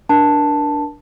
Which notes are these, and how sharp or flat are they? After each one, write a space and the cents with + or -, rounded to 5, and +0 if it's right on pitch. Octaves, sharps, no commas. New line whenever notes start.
D4 +0 A#4 +35 A5 +0